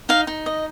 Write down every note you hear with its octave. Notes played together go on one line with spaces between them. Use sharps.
D#4 F5
D#4
D#5